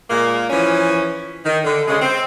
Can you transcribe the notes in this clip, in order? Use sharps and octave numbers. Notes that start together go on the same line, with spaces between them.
A#2 G#3 A#3
E3 F3 C#4
D#3
D3
C#3 G#3
C4